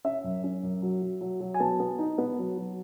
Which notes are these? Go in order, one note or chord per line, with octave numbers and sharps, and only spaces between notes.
C#4 E5
F#2
C#4
F#2
F#3
F#3
F#3
F#3
G#5
B3 A5
B3
D#4
B3
F#3
F#3